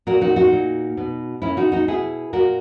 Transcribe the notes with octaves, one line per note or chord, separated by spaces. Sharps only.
A#2 F#4 A#4
D#4 F#4
D#4 F#4
A#2
B2
A#2 C#4 E4
D#4 F#4
D#4 F#4
B2 E4 G#4
A#2 F#4 A#4